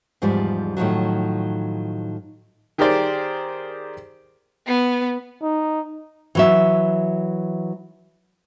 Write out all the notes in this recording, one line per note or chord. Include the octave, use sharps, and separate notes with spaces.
E2 G#2 F3 G3 D5
A2 D#3 F3 F#3
D#3 G4 G#4 A#4 C5 D5
B3
D#4
E3 F#3 E5